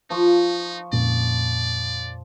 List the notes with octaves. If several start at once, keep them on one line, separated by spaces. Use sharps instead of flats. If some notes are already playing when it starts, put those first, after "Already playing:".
F3 D#4 C#6
F2 A#2 C#4 D5